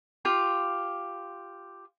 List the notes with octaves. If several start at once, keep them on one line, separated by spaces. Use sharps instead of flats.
F4 G4 C6